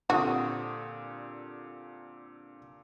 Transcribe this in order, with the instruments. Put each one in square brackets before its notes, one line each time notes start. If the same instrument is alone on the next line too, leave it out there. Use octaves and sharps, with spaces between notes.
[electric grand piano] A#2 G4 D#6 [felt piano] D3 C4 [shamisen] F#4